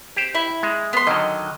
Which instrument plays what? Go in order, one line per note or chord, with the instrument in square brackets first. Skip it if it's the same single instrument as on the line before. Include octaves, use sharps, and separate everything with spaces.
[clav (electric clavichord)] G4 C5
[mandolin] E4
[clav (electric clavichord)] G#3
[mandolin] B3 C6
[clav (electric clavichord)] D3 D#3 F#3 [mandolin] D#5